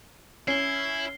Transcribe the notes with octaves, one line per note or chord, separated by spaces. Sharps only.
C#4 E4 C7 G7